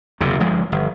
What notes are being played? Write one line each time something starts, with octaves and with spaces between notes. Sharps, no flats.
F#1 E2 C3
G1 F3 G#3
G1